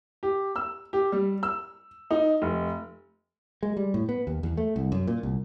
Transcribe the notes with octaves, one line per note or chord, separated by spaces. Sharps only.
G4
E6
G4
G3
E6
D#4
F1
G#3
G3
A2
B3
D#2
E2
A3
C2
F#2
A#2
C2